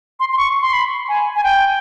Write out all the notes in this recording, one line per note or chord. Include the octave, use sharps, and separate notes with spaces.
C6
C6
C#6
C6
B5
G#5
G#5
G5